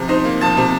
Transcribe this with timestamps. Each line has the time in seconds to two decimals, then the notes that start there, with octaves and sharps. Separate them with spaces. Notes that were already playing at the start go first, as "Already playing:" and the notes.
Already playing: C3 F3
0.08 D#4 C5
0.24 A#3
0.41 F3 A5
0.57 C3